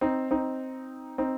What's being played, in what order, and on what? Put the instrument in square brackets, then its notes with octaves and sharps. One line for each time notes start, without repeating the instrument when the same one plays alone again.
[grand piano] C4 D#4
C4 D#4
C4 D#4